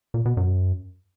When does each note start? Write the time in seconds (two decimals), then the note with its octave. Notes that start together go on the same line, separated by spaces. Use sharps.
0.14 A#2
0.25 B2
0.37 F#2